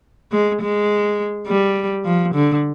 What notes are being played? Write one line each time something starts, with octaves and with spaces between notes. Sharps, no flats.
G#3
G#3
G3
F3
D3